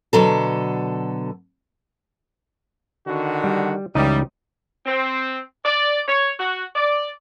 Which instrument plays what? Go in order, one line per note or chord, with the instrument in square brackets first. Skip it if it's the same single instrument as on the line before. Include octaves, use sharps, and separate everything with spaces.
[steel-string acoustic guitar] B2 D3 F#3 A4
[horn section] D3 D#3 F#4
[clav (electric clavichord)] G3
[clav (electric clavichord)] C#2 D#4 D#5 [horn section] E3 G3
[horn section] C4
D5
C#5
F#4
D5